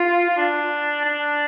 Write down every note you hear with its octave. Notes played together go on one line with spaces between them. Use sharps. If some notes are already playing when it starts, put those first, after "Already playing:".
Already playing: F4
F4
D4
D4